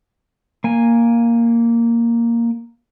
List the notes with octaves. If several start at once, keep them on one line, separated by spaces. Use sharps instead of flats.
A#3 G#5